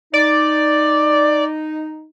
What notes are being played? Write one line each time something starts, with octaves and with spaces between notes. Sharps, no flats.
D#4 D5